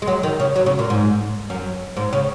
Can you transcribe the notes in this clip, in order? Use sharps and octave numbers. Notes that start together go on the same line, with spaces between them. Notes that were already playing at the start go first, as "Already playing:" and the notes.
G#3
F#3
D#3
C#3
F#3
C#3
A#2
G#2
F#2
G#2
C#3